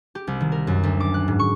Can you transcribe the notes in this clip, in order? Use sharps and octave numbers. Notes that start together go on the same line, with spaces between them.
G4
C2
D#3
A#4
F#2
D2
D6
F#6
G#2
C#6